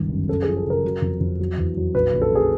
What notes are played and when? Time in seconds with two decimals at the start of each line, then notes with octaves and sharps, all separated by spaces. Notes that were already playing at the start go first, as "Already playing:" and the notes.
Already playing: G1 C#2 D#3
0.10 F#2
0.28 F#2 A4
0.42 G#4
0.47 F3
0.57 A4
0.66 C#3 A#4
0.85 F#3
1.02 F2
1.20 F2
1.40 F#3
1.58 E2
1.77 F#3
1.94 A#1 B4
2.14 A#1
2.22 A4
2.32 A#1 G#4